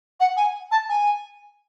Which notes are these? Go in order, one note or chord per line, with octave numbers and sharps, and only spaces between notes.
F#5
G#5
A5
G#5